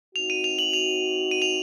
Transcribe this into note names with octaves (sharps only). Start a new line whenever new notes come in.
C4 D#4 F#4 F7
D#7
F7
F#7
F7
D#7
F7